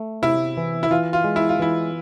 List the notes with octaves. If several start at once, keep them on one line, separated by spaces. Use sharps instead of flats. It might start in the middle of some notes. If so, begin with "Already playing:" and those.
Already playing: A3
C3 E4
E3
E4
E3 F4
F4
G#3
E4
F4
E3 E4